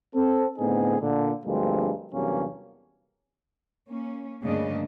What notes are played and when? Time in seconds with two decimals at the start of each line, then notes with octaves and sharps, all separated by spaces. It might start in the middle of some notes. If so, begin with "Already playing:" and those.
0.15 C4 A4
0.58 A2 D3 B3 C4 D#4 G#4
1.00 A#2 D3
1.45 D2 G2 F3 G#3 A#3 C4
2.13 E2 G2 C3 F#3 A#3 C#4
3.89 A#3 C#4
4.43 D2 G2 C#3 A#3 D4 D#5